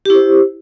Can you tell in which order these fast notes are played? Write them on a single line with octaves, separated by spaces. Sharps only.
G4 E4 C5